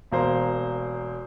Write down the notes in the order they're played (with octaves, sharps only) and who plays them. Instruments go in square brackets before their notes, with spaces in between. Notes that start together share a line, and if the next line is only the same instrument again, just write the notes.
[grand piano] E1 A#3 C5